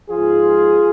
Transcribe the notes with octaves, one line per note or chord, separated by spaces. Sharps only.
G#2 F3 F4 G#4